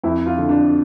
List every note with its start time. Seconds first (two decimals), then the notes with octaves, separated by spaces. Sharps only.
0.03 F2 E4
0.26 F4
0.38 D3
0.49 D4